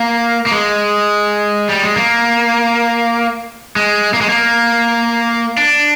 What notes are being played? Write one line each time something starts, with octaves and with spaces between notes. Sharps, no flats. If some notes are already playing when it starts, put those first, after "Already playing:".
Already playing: A#3
A#3
G#3
G3
G#3
A#3
G#3
A#3
G#3
A#3
D4